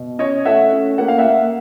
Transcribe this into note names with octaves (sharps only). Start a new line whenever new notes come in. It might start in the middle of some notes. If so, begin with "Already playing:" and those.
Already playing: B2
C#4 C#5 D#5
A3 E5 F#5
C#4
A#3 F#5
F5
E5 F#5
A#3